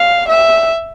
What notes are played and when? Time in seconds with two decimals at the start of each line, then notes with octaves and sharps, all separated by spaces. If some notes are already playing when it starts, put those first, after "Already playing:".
Already playing: F5
0.28 E5